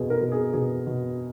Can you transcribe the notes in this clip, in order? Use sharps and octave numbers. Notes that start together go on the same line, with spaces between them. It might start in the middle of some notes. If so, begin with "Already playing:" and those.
Already playing: E2 B2 G#4
A#4
B2
G#4
B2 G#4
B2